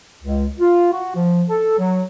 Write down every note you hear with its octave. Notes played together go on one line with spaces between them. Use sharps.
C#2
F4
F#4
F3
A4
F#3